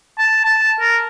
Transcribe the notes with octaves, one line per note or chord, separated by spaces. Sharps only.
A5
A5
A#4